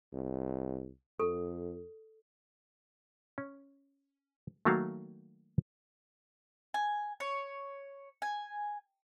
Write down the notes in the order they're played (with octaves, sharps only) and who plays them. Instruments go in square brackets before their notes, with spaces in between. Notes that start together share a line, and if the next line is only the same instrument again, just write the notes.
[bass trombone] C2
[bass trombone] F2 [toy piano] A4
[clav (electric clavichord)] C#4
D#3 F#3 A3 A#3 F#4 F5
[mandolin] G#5
C#5
G#5